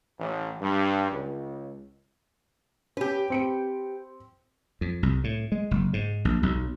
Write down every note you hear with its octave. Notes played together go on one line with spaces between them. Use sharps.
A1
G2
C#2
C#4 G4 B4
C4 C#7 D7
F2
C2
A2
G#3
F#1
G#2
A#1
B1